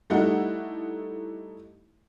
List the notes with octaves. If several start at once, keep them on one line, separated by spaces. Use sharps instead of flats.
G3 A3 D#4 E4 F#5